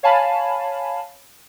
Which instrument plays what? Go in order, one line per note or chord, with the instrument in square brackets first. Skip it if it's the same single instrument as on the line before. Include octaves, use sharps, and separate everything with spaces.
[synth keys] C#5 F5 G#5 A5 B5